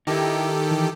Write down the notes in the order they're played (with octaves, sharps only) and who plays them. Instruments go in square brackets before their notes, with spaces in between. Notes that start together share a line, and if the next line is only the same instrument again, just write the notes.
[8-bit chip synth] D#3 G4 A4 [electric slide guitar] D#4 E4
[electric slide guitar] E3